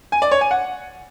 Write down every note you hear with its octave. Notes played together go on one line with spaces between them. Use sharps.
G#5
D5
C#5
G#5
F#5